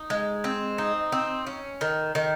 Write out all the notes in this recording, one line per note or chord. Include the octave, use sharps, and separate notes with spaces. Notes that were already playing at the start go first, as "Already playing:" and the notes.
Already playing: D#4
G#3
C4
D#4
C4
C#4
D#3
D#3